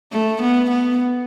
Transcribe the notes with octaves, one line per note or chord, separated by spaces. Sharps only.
A3
B3
B3